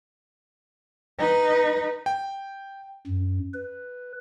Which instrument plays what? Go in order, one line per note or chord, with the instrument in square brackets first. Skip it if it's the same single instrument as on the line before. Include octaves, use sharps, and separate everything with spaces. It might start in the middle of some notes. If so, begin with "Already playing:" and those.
[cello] D#4 B4
[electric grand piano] G5
[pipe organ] F#2
B4